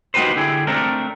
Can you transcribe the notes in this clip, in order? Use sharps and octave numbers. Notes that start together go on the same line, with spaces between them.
A#3 D#4 F#4 G4 B4 C5
D3 E4 G4 G#4
A3 C4 D4 A#4